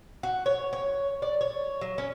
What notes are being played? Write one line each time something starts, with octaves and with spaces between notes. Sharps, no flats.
F#4
C#5
C#5
D5
C#5
F#3
C#4